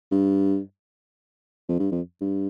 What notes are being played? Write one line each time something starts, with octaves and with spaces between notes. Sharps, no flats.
G2
F2
G2
F2
G2